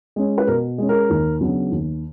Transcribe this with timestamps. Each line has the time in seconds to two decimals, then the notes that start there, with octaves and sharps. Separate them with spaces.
0.16 G#3 C#4
0.38 B4
0.47 B2 A#4
0.78 G#3 C#4
0.89 A#4
1.10 D#2
1.41 C#3 F#3 B3 D4
1.71 D#2